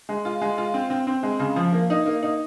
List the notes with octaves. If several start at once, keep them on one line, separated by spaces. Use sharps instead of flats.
G#3
F4
G#3
F4
C4
C4
C4
G#3
C#3
F3
A#3
D#4
A#3
D#4